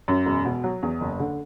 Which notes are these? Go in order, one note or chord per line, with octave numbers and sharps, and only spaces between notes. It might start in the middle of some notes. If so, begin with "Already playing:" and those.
F#2
E1
B2
F#3
E2
F#1
D3